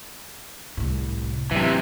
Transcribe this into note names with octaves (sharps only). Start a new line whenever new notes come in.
C2 A2
C3 E3 F#3